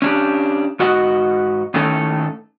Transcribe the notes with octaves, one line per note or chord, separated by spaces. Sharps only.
C#4 D4 G4
G#2 F#4 D#5 F#5
A2 D#3 A3 C#4 A4